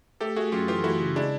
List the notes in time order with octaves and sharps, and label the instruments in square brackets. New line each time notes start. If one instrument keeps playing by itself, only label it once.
[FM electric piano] A3 [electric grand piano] G4 A4
[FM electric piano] A3 [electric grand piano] F#4 G#4
[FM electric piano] F#2 [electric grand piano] F4 G4
[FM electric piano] E3 [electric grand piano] F4 G4
[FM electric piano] A3 [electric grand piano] E4 F#4
[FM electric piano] C#3
[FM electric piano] G#3 [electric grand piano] D4 E4